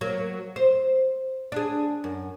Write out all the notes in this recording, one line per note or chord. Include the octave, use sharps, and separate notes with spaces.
F#3 A#3
C5
D4 G#4
F#2